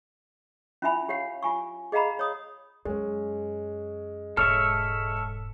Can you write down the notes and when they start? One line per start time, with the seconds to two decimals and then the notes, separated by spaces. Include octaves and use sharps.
0.82 C#4 E4 F4 E5 G#5 B5
1.09 G4 C#5 F5 F#5
1.43 F4 G#5 C#6
1.92 G#4 D#5 F5 F#5 A#5 B5
2.19 C#5 D#6
2.85 F#2 G#3 C#4
4.37 E1 G#2 A4 C#5 E5 F6